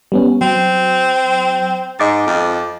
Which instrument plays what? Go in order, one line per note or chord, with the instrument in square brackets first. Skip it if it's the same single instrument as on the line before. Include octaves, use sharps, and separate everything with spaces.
[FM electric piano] G3 B3 C#4
[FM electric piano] F#3 [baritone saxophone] C4
[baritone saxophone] G#2 [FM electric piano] D#5 D6 A6
[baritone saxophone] F2